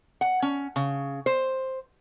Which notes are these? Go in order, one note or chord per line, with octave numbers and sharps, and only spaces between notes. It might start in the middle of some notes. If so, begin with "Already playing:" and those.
F#5
C#4
C#3
C5